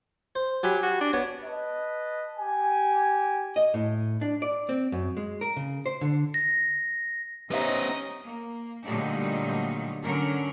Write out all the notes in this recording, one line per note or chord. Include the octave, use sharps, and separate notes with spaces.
C5
F#3 G4 G#5 B5
F#4
D4
B3 C#5 C#6
B4 D#5 A5
G4 G#5
D#5
A2
D4
D5
C4
F#2
G#3
A#4
C#3
C5
D3
A#6
B3 C#4 D#4 G4 C5 D#5 E5
A#3
A#2 D3 F#3 G3 A3 D#4
D3 F#3 C#4 A#4